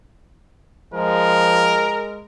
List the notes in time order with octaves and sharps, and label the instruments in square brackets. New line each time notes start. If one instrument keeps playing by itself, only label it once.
[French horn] F3 [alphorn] G#3 [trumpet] A#4